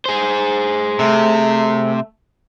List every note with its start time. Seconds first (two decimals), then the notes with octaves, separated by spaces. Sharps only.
0.05 G#4 C5
0.99 C3 A3